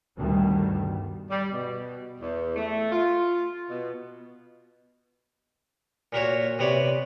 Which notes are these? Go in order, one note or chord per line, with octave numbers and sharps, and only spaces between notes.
D2 G2 B2 D#3 G3 A3
G3
B2
E2
A3
F4
B2
A#2 A#3 F#4 C#5
C3 B3 C#5 D5